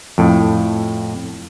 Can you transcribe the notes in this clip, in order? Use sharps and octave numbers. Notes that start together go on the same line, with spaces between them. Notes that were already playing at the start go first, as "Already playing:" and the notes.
F2 A2